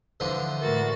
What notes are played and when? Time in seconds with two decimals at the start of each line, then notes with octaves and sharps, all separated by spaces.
0.20 D3 E3 F3
0.61 A2 F#4 A#4 A6